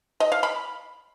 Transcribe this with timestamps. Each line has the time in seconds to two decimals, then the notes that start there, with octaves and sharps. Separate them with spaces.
0.20 D#5
0.32 F5
0.43 B5